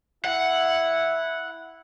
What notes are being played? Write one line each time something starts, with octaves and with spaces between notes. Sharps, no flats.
E4 F#5